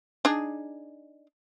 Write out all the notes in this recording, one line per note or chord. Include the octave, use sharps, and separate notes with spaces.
D4 D#4 G#4